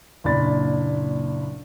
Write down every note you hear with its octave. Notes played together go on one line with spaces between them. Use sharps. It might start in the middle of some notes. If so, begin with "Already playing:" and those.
F#1 A#2 D4 B5 A6